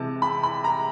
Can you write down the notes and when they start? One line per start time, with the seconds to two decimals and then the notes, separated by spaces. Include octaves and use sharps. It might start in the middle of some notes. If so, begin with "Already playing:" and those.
Already playing: C3 E3 G#3 A5
0.22 B5
0.43 B5
0.64 A#5